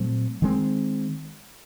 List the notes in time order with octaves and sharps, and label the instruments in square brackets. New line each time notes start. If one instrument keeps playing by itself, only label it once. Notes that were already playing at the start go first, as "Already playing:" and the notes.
Already playing: [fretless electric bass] A#2 F#3 A3 C4
D#3 G#3 C4